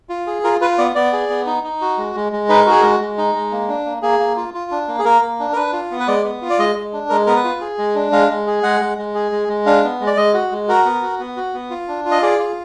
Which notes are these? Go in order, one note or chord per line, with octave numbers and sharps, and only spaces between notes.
F4
G#4
F4 A#4
F4 B4
B3 D5
B3 D5
G#4
B3
D#4
D#4
F#4
G#3
G#3
G#3
D#4 B4
A#4
F#4
G#4
G#3 A#4
G#3
D#4
G#3
A#3
D4
A#3
A#3 G#4
A#3
F4
F4
D4
A#3
G#4
A#3 A#4
A#3
D4
A#4
D4 B4
F4
B3
B4
G#3 D5
B3
F4
D5
G#3 D#5
G#3
D4
G#3 A#4
B3 A#4
B4
F4
G#4
G#3
D4
G#3 F5
G#3
G#4
G#3 F#5
G#3
G#3
G#4
G#3
G#3
D4 F5
B3
G#3
D5
G#3 D#5
F#4
G#3
F#4 A#4
B3
F#4
B3
F#4
B3
F4
D4
F4
D#5
G#4 D5
F4